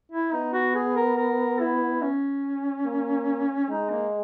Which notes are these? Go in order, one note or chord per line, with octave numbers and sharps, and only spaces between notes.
E4
B3 D#4
F#4
G#4
A#4
A#4
E4
C#4
A#3
G#3 D#4
A#3